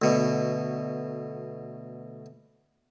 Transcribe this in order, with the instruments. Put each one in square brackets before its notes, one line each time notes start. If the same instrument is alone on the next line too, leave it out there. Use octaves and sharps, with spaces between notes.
[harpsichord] D2 B2